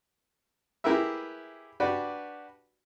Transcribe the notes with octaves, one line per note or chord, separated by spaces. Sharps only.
E4 G4 G#4 A#4 B4 E5
D4 F#4 G4 B4 D5